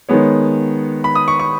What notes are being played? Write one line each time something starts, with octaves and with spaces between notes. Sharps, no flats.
D#3 G#3 B3 C#5
B5
D#6
C#6
C#6